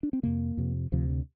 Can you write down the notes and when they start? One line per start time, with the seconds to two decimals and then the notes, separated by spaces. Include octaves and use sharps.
0.03 D4
0.13 C4
0.23 F2 C3 A#3
0.57 F2 C3
0.92 D2 C3 F3
1.09 D3